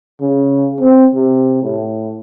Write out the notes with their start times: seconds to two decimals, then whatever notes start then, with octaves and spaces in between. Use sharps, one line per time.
0.21 C#3
0.80 C4
1.14 C3
1.62 A2